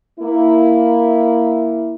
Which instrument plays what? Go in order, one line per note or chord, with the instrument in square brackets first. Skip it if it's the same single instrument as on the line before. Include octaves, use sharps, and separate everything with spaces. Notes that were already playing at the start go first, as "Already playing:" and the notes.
[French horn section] A#3 E4